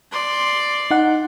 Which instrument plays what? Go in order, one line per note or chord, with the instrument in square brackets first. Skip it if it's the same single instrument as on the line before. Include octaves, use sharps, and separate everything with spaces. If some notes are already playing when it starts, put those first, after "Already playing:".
[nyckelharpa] D5 C6
[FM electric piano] D#4 F#5